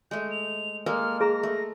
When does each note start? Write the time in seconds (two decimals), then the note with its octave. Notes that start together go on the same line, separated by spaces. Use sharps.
0.11 G#3 A3 G6
0.31 F7
0.86 G#3 A#3 A4 A#4 F6
1.21 G#4 A#5 A#6
1.43 A3